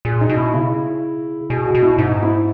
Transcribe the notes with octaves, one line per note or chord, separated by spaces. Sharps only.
A#2 G#4
D#4
B2
E4
C#3 E4
B2 G#4
F#4
B2
E4
G#2 D#4
E4